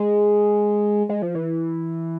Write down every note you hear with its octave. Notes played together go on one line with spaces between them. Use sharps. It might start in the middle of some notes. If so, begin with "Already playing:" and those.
Already playing: G#3
G#3
F3
E3